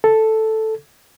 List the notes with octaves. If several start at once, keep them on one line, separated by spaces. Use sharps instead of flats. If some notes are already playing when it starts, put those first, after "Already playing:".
A4